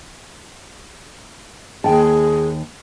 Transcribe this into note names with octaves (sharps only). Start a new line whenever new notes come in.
D#2 G#4 G5 A5